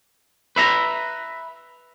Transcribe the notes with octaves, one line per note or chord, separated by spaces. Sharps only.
B4 E5 A#5